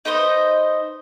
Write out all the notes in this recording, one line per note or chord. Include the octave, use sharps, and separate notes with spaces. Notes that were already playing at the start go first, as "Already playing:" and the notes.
D#4 B4 C5 D#5